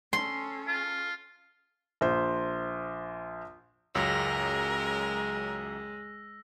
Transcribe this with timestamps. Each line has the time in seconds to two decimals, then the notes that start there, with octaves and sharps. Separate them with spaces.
0.13 C#4 A4 C6
0.67 F4
2.01 A#1 C5
3.95 C#2 F#2 G#3 A#4 E6 A#6